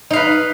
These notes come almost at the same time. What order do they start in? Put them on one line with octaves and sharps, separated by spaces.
D#4 F5 B4